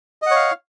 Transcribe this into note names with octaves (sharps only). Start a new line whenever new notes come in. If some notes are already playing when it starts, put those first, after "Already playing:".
C#5 D#5 F5 F#5